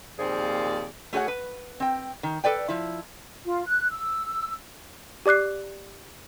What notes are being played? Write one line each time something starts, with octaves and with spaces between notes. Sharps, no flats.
D#2 A#2 F3 C4 G#4 D5
A3 F#4 G#4 C#5 F#5
B4
C4 G5
D#3
A4 B4 D5 G5
F3 E4
F4
F#6
E6
G4 D5 D6 F#6 C7